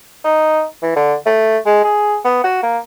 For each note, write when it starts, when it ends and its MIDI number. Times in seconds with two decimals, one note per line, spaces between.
0.24 0.63 63
0.82 0.93 52
0.96 1.14 50
1.26 1.58 57
1.66 1.83 56
1.84 2.17 68
2.24 2.41 59
2.44 2.60 66
2.63 2.78 58